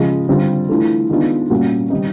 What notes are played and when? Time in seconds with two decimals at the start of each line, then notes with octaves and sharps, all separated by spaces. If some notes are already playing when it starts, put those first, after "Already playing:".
Already playing: C#3 F3 G#3
0.28 D3 G3 C4 F4
0.69 E3 A3 D4 F4
1.09 D#3 G#3 B3 D4 F4
1.50 A#2 G3 A#3 C#4 F#4
1.90 D#3 G3 C4 D#4